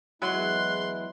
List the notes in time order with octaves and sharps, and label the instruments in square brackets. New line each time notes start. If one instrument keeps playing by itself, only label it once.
[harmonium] E2 G#3 E4 [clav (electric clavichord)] F#3 [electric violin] C6 [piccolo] F#6